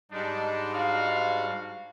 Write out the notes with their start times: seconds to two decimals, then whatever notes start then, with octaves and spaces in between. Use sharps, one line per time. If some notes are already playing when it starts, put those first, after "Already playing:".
0.12 G#2 G3 G#3 D4 D#4
0.73 D4 F#4 F5